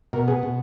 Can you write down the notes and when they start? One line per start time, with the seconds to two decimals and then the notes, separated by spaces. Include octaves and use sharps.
0.13 B2 A#4
0.28 B3 G#4
0.43 B2